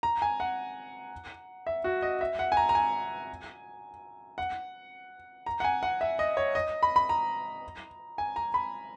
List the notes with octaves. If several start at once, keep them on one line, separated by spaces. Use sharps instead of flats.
A#5
G#5
F#5
E5
F#4
D#5
E5
F#5
G#5
A#5
A#5
G#5
F#5
A#5
F#5
G#5
F#5
E5
D#5
C#5
D#5
B5
B5
A#5
G#5
A#5
B5